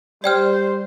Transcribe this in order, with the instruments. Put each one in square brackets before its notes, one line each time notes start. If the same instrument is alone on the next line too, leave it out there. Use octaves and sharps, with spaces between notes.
[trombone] G3 [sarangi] C5 [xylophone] D5 G5 F6